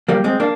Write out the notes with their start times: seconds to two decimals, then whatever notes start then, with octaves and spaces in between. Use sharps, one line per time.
0.09 G3 A#3
0.24 G#3 C4
0.40 A#3 D4